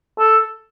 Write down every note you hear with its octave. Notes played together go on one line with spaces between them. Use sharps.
A4